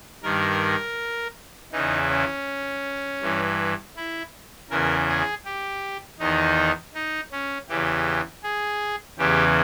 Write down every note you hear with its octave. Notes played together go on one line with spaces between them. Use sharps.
G2 D#3 A#4
E2 C#3 E3 D#4
C#4
G2 E3
E4
E2 C#3 E3 A#4
G#4
G4
E2 D#3 D#4
D#4
C#4
E2 C#3 E3 G4
G#4
E2 C#3 E3 G4